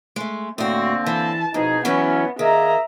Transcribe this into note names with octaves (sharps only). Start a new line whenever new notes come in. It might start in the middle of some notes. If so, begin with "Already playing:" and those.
G#3 A3
A2 D3 A#3 C4 F#4
E3 A5
F2 B2 D#4 G#4
E3 F#3 B3 C#4 E4
D#3 A#3 G#4 D#5 E5 A#5